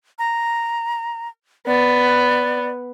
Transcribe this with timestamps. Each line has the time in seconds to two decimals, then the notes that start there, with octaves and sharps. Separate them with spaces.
0.19 A#5
1.67 B3 D5